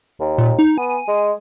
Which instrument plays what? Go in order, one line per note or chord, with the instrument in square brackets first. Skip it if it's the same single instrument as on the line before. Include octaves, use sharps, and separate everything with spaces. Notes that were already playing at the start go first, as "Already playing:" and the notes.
[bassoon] D#2
[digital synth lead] A#2
D#4
[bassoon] B3 [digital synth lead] G#5
[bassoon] G#3